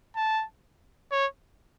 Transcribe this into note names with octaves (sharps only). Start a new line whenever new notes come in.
A5
C#5